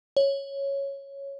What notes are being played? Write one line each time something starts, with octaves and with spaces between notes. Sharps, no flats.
C#5